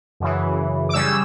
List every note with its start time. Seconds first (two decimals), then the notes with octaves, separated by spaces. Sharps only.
0.20 F#2 C#3 E3
0.89 D6
0.94 C#3 G3 C#4 E6